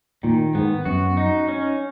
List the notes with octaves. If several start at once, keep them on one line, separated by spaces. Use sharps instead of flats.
A#2 D#3
G#2 B3
F#2 F#4
D#4
C#4